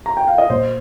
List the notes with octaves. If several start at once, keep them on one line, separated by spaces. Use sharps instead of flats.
A#5
G5
F5
D#5
A#2 A#3 C5